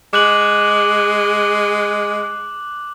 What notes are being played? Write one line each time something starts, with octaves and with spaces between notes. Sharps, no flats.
G#3 D6 F#6 F#7